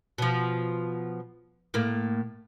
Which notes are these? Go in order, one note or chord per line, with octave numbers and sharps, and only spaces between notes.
B2 F3
A2 A#3